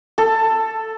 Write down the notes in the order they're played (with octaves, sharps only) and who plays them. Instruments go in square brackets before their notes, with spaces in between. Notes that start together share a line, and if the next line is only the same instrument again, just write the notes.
[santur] A4